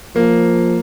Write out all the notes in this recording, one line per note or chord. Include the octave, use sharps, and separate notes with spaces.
F3 A#3